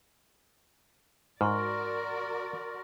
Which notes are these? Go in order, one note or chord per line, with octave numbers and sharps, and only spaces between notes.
G#2 F#4 A#4 D5 C6 C#6 F6